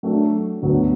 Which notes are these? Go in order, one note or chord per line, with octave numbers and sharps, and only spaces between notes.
F#3 A3 D4
D2 D3 F#3 B3 D4